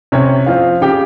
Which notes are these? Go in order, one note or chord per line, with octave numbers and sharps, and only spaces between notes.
C3 C#4 C#5
F3 C4 F4 F5
C#3 G4 G5